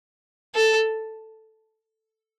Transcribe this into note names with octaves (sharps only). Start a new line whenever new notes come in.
A4